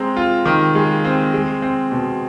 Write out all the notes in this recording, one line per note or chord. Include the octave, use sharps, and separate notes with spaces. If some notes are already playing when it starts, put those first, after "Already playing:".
Already playing: G#3 C4 A#5 C6
F4
D#3
G#3
C4
G#3
C4
B2